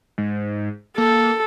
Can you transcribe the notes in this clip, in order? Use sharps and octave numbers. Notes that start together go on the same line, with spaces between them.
G#2
A#3 A4